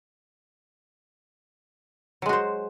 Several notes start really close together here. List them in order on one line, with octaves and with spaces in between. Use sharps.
F#3 G#3 F#4 C5